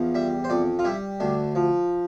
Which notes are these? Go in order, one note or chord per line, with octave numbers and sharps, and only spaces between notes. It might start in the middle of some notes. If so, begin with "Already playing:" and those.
Already playing: E2 F3
G3 E5
C5
F2 D5
F4
G3 E4
D2 D4
F3